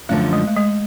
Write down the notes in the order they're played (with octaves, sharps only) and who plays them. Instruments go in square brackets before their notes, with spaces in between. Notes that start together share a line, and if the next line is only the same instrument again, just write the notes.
[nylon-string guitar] F#2 D3 F3 [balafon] A3
[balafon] G#3
A3
G#3